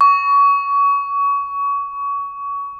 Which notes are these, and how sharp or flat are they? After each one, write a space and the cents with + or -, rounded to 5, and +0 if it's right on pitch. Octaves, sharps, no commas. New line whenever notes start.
C#6 +25